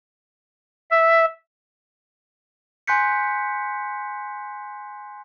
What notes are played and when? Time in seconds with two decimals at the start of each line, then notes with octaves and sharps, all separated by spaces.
0.91 E5
2.87 G#5 C6 F#6 G6 B6 C#7